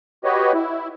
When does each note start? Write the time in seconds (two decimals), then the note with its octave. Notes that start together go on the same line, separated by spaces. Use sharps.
0.24 F#4 G4 B4 C#5 D#5
0.54 E4